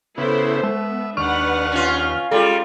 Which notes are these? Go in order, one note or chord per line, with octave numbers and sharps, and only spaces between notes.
C#3 B3 E4 A4 C5
G#3 B3 E5
D#2 D4 B4 F#5 C#6 F6
C#4 F4
G3 G#3 F4 A4